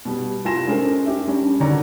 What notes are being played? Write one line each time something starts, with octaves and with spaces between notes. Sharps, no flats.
B2 G3
C2 F4 G#5 C6 A#6 E7
G#3 C#4 A4 A#4 C5
G4 E5
G3 C#4 D4
D3 D#3 F#4 C#5 D5 A#5